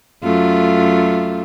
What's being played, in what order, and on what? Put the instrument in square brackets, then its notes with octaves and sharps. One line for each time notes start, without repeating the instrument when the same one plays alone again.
[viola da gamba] F#2 A3 F4